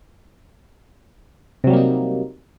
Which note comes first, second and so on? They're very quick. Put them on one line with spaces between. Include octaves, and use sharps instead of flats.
C3 F#3 G3 A#3 D#4